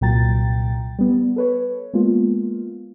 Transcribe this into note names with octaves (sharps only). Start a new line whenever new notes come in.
C2 A#2 F#3 G5 A#5 A6
G3 B3
A4 B4 C#5
G#3 A#3 B3 F4